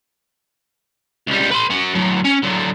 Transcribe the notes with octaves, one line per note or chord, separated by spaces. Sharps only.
C#2 G3
B4 C6
C#4 F#4
A2 F#3
C#4
D3 F#3